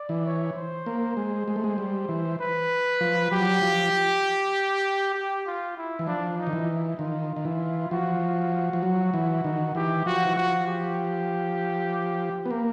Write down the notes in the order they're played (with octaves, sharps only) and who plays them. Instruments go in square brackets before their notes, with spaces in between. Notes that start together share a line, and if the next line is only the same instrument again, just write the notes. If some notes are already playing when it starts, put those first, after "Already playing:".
Already playing: [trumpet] D5
[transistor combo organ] E3
[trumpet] C#5
C5
[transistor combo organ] A#3
G#3
G#3
A3
G#3
G3
E3
[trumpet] B4
[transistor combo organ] F3
[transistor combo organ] F#3 [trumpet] G4
[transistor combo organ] F3
[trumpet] G4
F4
E4
[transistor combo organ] E3
[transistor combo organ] F3 [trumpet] D4
[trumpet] D#4
[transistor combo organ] D#3
E3
[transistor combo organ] D#3 [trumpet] F4
[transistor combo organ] D#3
E3
[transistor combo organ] F3 [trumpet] F#4
[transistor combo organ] F3
F#3
E3
D#3
[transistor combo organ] E3 [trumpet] G4
[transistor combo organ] F3 [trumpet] F#4
[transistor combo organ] E3
[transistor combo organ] F3 [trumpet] F#4
[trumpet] G4
[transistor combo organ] B3
A#3